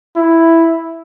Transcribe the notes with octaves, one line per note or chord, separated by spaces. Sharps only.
E4